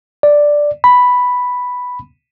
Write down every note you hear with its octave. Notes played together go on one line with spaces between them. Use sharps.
D5
B5